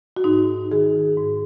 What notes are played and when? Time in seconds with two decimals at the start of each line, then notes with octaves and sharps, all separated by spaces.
0.17 F#4
0.24 G#2 D#4
0.72 D#3 G#4
1.17 G#2